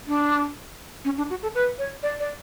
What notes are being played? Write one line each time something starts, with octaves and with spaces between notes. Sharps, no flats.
D4
C#4
D4
F#4
A4
B4
C#5
D5
D5